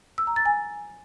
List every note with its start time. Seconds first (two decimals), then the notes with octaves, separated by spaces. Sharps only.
0.18 E6
0.27 A#5
0.36 A6
0.46 G#5